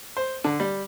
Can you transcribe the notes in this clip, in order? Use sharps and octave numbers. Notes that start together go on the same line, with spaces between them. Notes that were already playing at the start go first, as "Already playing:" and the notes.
C5
D3
G3